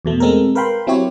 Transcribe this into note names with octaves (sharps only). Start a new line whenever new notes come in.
E2 B2 A3
G#3 C4 A4 A#4
A#4 B4 F5 G5 B5 C6
F#3 C4 E4 F#4 G4 C#5